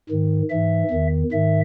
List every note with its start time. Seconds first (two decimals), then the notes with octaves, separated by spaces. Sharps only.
0.09 G#2 D#3
0.50 G#2 E3 E5
0.91 E2 D#3
1.32 G#2 D#3 E5